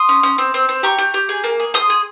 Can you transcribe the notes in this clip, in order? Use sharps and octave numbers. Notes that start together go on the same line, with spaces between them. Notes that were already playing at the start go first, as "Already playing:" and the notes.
Already playing: C6 D#6
C#4
C#4
C4
C4
C4
G4 A#5 C#6
G4
G4
G#4
A#3
G#4
G#4 C6 D#6
G#4